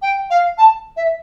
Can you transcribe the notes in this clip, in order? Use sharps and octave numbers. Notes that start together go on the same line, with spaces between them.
G5
F5
A5
E5